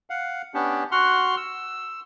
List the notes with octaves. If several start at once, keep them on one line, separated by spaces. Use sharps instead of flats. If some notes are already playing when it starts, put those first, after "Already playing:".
F5 F#5
B3 C#4 D4 G4
F#4 F#5 C6 F6
E6